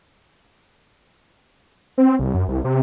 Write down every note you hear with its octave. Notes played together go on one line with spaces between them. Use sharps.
C4
C2
F#2
C2
C3